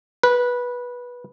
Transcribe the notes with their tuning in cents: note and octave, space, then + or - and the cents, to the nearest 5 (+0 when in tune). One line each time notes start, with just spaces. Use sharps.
B4 -15